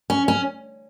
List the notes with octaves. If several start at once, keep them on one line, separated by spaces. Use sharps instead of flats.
C#4
C#4